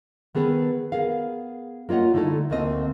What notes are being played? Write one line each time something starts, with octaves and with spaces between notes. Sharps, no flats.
D#3 B3 G#4 A4 B4
B3 G#4 A#4 F5
A#3 F4 C#5 D#5 F#5
D3 A3 D#4 E4 A4
D2 A3 A#3 C4 D#5